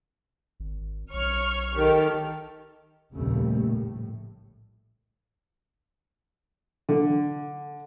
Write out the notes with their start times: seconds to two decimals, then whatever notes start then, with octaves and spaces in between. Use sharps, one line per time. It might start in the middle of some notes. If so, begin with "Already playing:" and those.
0.60 G#1
1.13 B1 C#5 C#6 F6
1.76 D#3 G4 A4 F6
3.14 F1 A#1 D#2 C#3 G3 A3
3.67 A2
6.89 D3